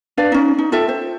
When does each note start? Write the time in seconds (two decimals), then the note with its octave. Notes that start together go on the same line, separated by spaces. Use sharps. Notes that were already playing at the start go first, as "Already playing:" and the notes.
0.17 D4 B4 D5 F5
0.32 C#4 D#4
0.58 D#4
0.72 F4 A4 E5 G5
0.89 C5